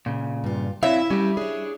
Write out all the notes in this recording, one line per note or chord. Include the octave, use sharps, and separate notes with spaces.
A#2 C#3
G2 F4
C4 E4 C#5 E5 F5
G3 C#4 G4
D4 G#4 C#5